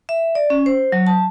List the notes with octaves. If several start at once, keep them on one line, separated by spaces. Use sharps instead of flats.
E5
D5
C#4
C5
F#3
A5